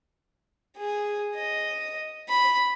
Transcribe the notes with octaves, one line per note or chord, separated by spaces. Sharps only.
G#4
D#5
B5